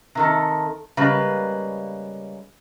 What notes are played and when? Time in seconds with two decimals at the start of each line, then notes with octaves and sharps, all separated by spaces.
0.15 C3 D#3 A4
0.97 C#3 G3 G#3 A#3 B4